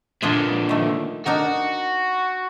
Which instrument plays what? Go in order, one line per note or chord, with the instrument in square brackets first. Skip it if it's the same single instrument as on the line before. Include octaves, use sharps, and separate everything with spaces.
[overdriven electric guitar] A#2 D3 [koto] D4 F4 G#4
[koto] D#3 A3
[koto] D4 D#4 A#4 [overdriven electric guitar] F#4